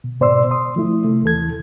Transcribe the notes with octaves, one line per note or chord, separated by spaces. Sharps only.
B2
G#2 B2 C5 D5 C6 E6
C6 D#6
F3 A3 E4
C3 A3
D#2 E3 A4 G#6